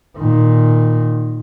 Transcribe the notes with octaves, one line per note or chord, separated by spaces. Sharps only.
A#2 D#3